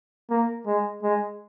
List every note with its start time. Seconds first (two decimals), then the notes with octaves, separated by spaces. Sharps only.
0.31 A#3
0.66 G#3
1.03 G#3